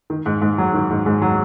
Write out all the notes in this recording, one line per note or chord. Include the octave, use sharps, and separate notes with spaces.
D#3
G#2
G#2
F#3
D#3
G#2
G#2
F#3